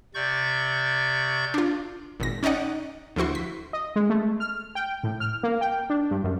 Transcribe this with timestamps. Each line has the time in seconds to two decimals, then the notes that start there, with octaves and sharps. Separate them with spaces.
0.15 C3 D5 C#6 G6
1.54 D4 F4
2.20 G#1 A#2 A#6
2.43 C#4 D#4 D5 D#5 F#5
3.16 D2 F3 E4 F#4 C6
3.35 B6
3.73 D#5
3.96 G#3
4.10 A3
4.40 F6
4.75 G5
5.03 A2
5.20 F6
5.43 A#3
5.61 G5
5.90 D4
6.11 G2
6.24 F#2